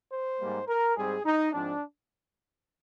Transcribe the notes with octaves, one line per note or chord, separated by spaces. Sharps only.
C5
G#2 G3 A#3
A#4
G#2 G3 C4 G#4
D#4
G#2 F3 C4 D4